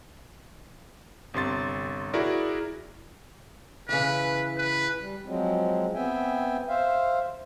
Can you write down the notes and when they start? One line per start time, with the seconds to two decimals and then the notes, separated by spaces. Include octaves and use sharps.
1.34 G1 C3 C6 A6
2.14 E4 F#4 G#4 A#4 D5
3.89 C#3 E3 B4
4.58 B4
4.99 G3
5.26 F3 F#3 G#3 C4
5.94 B3 C4 E5 G5 G#5
6.68 C5 E5 F5